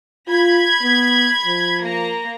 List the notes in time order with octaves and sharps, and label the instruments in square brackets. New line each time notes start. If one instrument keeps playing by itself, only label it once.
[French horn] F4 [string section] B5 G#6
[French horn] B3
F3
[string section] A#3 A#5